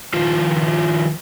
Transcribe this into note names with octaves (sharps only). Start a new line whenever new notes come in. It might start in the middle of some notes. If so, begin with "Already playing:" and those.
D#3 F3 F4